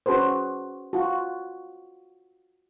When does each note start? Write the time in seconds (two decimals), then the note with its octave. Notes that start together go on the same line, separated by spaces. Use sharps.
0.06 C#4 F#4 G#4 B4 C5
0.93 F4 F#4